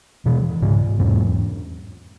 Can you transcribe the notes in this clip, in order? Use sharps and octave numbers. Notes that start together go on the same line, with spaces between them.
B2 E3
G#2 C#3
E2 G#2